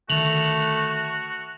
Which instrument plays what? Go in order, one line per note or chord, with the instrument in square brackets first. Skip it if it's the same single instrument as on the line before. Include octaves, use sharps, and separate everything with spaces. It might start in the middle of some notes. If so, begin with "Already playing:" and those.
[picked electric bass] D3 D#3 [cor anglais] A3 [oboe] F#4 [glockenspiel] F7 F#7